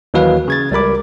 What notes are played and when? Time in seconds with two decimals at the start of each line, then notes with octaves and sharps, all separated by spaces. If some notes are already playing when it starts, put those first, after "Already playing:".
0.14 D#2 E3 F#3 F#4 B4 F5
0.48 C#3 G#6 A6
0.71 C#2 G3 A#4 B5 D6